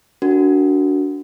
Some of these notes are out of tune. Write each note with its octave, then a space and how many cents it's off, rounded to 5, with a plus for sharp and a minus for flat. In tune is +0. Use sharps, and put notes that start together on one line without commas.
D4 -20 F#4 +0 A#4 -25